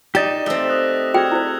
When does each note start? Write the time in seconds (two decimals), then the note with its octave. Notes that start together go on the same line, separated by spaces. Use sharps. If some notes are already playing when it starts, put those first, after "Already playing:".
0.15 D#4 G4 D5 D#5 E7
0.46 A3 C4 A4 E6 G7
0.68 D#6 F#6 A#6
1.14 F#4 G#4 G5 D#6 F6 G#6
1.32 E4 C5